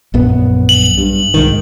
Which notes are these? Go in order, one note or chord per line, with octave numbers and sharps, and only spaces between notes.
A#1 F#2 B3
F#7
G2
C2 G#2 D#3